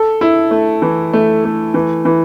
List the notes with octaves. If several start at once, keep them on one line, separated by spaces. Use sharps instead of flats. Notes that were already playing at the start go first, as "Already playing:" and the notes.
Already playing: A4
E4
A3
E3
A3
A3
E3
E3